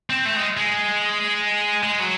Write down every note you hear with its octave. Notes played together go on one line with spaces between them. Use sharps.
C4
A3
G#3
G#3
G#3
F#3